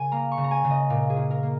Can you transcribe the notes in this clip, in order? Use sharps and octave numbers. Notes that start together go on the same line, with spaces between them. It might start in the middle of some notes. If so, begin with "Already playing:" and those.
Already playing: C#3 A#4 G#5
A#3 A#5
C#6
C#3
A#5
G#5
C#3
D#5
A#2 A#4
G#4
A#2
A#4
A#3